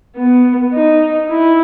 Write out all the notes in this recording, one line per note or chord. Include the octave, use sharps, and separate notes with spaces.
B3
D#4
E4